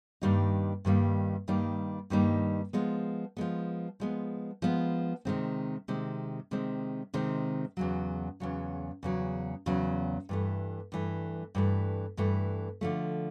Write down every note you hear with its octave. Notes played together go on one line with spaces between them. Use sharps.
G2 D#3 G3 A#3 D#4
G2 D#3 G3 A#3 D#4
G2 D#3 G3 A#3 D#4
G2 D#3 G3 A#3 D#4
F3 G#3 B3
F3 G#3 B3
F3 G#3 B3
F3 G#3 B3
C3 D#3 G#3 C4
C3 D#3 G#3 C4
C3 D#3 G#3 C4
C3 D#3 G#3 C4
E2 C#3 F#3
E2 C#3 F#3
E2 C#3 F#3
E2 C#3 F#3
G2 E3 A3
G2 E3 A3
G2 E3 A3
G2 E3 A3
D3 F3 A3